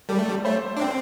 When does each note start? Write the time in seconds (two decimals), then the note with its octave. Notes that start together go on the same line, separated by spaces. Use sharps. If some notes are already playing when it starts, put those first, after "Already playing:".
0.09 G3 A4 D5
0.19 A3
0.29 G3
0.45 A3 C5 E5
0.76 D4
0.81 C4 D5 G5